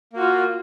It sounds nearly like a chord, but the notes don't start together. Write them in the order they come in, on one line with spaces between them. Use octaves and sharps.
A#3 F#4 F4